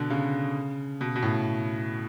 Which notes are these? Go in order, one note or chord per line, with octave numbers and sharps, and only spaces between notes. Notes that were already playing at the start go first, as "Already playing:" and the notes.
Already playing: B2 D3
C#3
B2
B2
A2